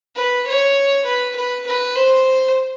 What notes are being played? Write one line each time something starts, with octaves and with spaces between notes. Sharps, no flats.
B4
C#5
B4
B4
B4
C5